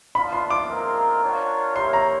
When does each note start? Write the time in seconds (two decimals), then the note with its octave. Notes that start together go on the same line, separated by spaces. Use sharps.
0.15 B3 D4 F4 B5
0.33 C6
0.50 D6
0.68 G#3 C4 F4 A#4
1.22 D4 F4 A#4 C#5 F#5
1.75 E4 G4 A#4 C#5 C6
1.93 A#5